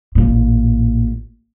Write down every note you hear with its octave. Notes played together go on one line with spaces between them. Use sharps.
A1 A#2